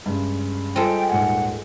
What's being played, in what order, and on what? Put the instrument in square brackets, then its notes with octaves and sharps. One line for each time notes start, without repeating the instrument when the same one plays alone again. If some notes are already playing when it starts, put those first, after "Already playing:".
[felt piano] G2 C#3 G#3
[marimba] G3 F4 C5 [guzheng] G#3 A4 [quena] G5
[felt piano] D#1 G#2 G#5 [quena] F#5